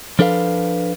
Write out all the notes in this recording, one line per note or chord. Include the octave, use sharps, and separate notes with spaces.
F3 D4 A4 B4 F5